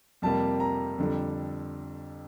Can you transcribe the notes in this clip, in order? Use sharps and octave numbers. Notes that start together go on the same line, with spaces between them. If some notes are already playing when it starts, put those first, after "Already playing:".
F2 C3 G3 A#3 A5
A#5
F2 D3 G3